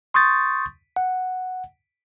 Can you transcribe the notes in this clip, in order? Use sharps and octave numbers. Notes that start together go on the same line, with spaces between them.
C6 C#6 D#6 G6 A6
F#5